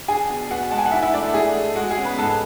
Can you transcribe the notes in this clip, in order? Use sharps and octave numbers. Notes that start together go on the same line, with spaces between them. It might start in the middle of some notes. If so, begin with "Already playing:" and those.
D4 G#4 G#5
B2
B3 F#4 F#5
G#3 A5
G#5
F#5
D4 E4 E5
E4 E5
A3 D4 D5
A3 G#4
A3
G#3 F#4
G#4
C#4
B3 B4
G#2 A4 A5